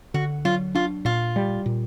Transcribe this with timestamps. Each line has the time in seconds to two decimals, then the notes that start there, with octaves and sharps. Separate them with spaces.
0.14 D3 F#4
0.45 F#3 F4
0.75 D4 F4
1.05 A#2 F4
1.36 G3
1.66 A#2